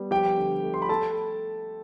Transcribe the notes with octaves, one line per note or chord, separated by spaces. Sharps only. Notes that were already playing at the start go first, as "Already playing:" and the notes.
Already playing: G3 B3
F3 G4 G5
D3
A3
C6
B5
A3 A4 A5